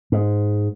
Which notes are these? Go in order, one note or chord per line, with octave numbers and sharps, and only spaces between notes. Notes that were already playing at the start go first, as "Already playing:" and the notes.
G#2